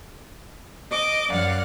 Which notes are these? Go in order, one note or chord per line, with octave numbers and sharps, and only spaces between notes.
D#5 D6 D#6
F#2 D5 F5 F#5